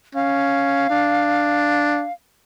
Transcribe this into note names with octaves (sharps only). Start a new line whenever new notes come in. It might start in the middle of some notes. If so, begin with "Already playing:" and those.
C#4 F5
D4